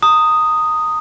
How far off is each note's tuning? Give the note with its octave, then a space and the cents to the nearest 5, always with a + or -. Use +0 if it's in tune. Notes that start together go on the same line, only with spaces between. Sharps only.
A#5 -30 D#6 +0